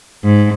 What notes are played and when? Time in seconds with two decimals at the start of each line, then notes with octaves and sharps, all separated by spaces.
0.24 G#2